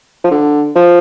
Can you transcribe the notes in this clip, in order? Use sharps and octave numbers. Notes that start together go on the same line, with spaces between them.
F3
D3
F3